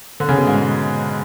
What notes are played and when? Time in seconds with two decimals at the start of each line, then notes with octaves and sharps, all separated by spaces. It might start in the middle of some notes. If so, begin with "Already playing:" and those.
0.20 D3
0.29 C#3
0.38 B2
0.47 G#2